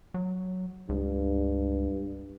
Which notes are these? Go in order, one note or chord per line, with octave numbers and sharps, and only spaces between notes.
F#3
C#2 G2